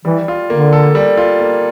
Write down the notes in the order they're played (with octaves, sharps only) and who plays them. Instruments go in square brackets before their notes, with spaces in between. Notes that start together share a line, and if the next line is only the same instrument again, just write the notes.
[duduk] E3 [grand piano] G3
[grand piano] F4
[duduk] D3 [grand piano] A#3
[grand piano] A4
G3
F4
A#3